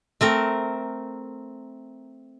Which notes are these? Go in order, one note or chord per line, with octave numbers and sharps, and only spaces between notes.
A3 C4 A#4